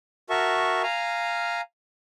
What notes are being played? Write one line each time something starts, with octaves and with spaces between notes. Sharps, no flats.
F#4 A#4 E5 A5 C#6
F5 G#5 A#5 F6